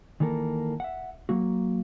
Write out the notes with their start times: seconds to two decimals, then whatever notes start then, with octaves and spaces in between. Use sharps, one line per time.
0.20 D#3 E3 A#3 A4 A#4
0.80 E5 F#5
1.29 F#3 A#3 F#4